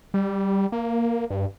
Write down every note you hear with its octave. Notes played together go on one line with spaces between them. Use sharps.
G3
A#3
G2